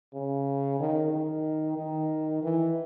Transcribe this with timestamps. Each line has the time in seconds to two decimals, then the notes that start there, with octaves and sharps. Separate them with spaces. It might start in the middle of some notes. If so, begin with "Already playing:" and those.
0.14 C#3
0.80 D#3
1.12 D#3
1.78 D#3
2.43 E3